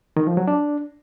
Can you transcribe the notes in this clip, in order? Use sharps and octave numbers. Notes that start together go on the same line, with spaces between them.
D#3
F3
F#3
D4